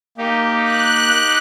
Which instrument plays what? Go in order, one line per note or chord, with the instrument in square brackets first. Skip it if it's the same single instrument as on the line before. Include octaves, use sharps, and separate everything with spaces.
[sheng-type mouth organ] A#3 [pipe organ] D#4 G4
[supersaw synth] F#6